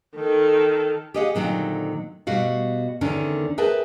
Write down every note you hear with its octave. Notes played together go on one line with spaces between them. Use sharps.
D#3 A4
G4 G#4 D#5 F5 F#5
A#2 D3 D#3 F#3 C4
B2 G3 F#4 F5
E2 D3 D#3 C#4 D4
G#4 A#4 B4 E5 G5 A5